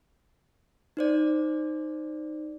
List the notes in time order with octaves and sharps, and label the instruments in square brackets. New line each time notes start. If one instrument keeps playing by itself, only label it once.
[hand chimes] D#4 C5 D5